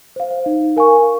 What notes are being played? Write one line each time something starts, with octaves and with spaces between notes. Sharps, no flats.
C5 F5
D#4
A#4 F5 G#5 C#6